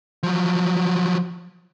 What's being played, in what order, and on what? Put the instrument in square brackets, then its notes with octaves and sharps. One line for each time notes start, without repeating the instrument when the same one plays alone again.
[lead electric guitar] F3 F#3